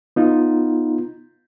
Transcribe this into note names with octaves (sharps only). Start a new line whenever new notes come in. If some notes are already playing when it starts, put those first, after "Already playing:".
B3 D#4 F4